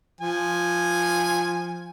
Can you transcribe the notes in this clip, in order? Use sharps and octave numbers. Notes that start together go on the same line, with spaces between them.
F3 G#5